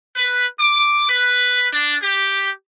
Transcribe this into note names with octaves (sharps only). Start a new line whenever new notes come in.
B4
D6
B4
D4
G4